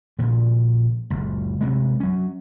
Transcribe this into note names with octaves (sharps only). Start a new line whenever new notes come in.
A#2 C#3 F3
F#1 C#2
G2 C3 G#3
F#3 C#4